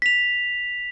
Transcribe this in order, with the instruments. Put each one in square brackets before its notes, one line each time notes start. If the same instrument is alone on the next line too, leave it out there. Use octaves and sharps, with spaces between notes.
[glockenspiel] B6 F7